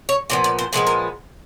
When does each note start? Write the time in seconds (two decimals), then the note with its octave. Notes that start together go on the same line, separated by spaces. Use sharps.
0.09 C#5
0.30 A#2 F3 B3 D5
0.44 D5
0.59 C5
0.73 A#2 F3 G#3 B3 B4
0.87 A#4